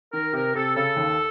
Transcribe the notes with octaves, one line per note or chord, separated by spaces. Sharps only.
D#3 A#4
C3 A#4
C3 A4
C#3 A4
D#2